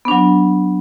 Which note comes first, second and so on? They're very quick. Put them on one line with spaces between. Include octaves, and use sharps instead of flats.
B3 D4 F#3